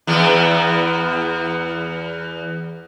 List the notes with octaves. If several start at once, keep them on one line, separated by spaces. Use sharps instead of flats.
E2 B3